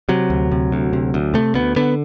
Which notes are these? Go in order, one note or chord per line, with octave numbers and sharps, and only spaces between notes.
C3 F#3
D2
C3
D2
C3
D2
C3 A3
D2 B3
D3 B3